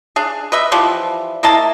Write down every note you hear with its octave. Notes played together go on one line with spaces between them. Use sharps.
D4 G#4
B4 D#5 E5
E3 F3 G3
A#3 E4 D#5 A5